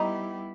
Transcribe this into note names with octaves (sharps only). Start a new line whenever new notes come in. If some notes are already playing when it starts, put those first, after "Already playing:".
Already playing: G3 B3 D#4 E4 G4